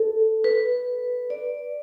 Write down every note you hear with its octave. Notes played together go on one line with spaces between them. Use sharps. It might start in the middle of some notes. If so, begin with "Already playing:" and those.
Already playing: A4
B4
D5